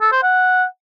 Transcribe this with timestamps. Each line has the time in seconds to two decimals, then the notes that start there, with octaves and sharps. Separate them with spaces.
0.01 A4
0.12 C5
0.23 F#5